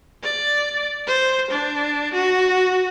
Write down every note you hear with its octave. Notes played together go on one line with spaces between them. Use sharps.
D5
C5
D4
F#4